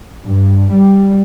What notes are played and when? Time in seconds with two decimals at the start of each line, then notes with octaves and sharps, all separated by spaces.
0.24 G2
0.73 G3